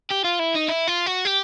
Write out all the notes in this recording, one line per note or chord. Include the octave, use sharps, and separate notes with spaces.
G4
F4
E4
D#4
E4
F4
F#4
G4